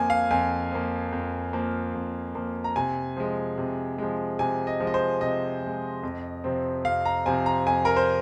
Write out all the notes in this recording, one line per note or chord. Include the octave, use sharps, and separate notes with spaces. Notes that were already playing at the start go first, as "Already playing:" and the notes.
Already playing: F2 F3 A#3 G#5
F5
F2 G#5
F3 A#3
F2
F3 A#3
F2
F3 A#3
A#5
C3 G#5
F3 G#3
C3
F3 G#3
C3 G#5
D#5
F3 G#3
D#5
C5
C3 D#5
F3 G#3
F2
C3 F3 C4
F2 F5
A#5
C3 F3 C4 G#5
A#5
F2 G#5
A#4
C5